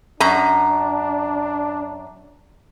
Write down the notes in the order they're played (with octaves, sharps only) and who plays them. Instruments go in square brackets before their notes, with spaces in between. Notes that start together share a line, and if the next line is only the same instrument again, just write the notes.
[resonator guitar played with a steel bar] F#2 A#5 [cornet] D4